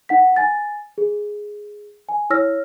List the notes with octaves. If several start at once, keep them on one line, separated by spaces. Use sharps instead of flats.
D#4 F#5 B6
G#5 A6
G#4
G#5
E4 C#5 E6 F6 A#6